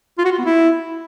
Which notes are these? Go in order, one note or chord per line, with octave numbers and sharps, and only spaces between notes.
F4
F#4
F4
B3
E4